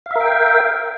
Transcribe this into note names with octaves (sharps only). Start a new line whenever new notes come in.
A#4 E5 F5 G5